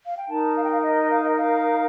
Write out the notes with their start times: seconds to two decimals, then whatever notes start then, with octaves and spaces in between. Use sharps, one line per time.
0.04 F5
0.17 G5
0.29 D#4 A#4 A5
0.56 F5
0.63 G5
0.70 F5
0.83 D#5
1.10 F5
1.24 D#5
1.37 F5